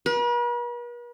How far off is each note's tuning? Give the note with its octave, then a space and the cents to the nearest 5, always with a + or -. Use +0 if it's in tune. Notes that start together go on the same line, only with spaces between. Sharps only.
B4 -45